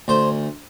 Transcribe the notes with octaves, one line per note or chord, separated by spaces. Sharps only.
D2 C5